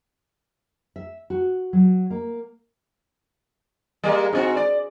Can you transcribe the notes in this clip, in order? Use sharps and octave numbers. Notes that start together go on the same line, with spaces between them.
E5
F#4
F#3
A#3
G3 G#3 A#3
G#2 C4 F#4
D5